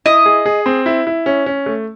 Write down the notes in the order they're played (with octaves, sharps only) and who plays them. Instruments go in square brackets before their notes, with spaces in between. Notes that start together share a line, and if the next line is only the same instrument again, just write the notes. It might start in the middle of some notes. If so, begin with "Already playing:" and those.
[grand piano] E4 [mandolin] D#5
[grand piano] G#4
G#4
C4
E4
E4
C#4
C#4
A3